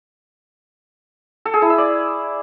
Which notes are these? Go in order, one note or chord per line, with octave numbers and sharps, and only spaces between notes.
A4
G#4
E4
E5
D5